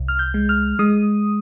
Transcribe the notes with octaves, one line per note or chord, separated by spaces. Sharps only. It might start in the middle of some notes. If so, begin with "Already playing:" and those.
Already playing: C2
F6
G6
G#3
F6
G#3 D#6